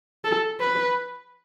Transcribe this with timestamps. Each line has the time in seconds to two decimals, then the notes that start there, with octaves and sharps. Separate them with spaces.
0.24 A4
0.60 B4